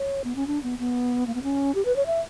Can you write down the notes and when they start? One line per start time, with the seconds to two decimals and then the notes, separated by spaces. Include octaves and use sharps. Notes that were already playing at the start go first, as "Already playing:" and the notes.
Already playing: C#5
0.24 B3
0.36 C#4
0.47 D4
0.63 B3
0.79 B3
1.27 A#3
1.35 B3
1.43 C#4
1.75 G4
1.85 B4
1.96 C#5
2.06 E5